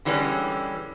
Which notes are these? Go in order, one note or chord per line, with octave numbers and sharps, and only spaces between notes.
D3 E3 G3 G#3 C#4